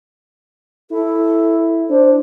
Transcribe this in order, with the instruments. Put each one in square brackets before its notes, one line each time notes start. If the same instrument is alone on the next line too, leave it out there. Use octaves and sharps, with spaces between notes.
[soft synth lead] E4 [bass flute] A4
[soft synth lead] D4 [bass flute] C5